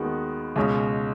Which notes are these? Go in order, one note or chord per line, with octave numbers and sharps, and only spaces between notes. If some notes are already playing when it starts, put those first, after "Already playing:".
Already playing: D#2 D#3 G#3 B3 F#4
C#2 B2 G#3 C#4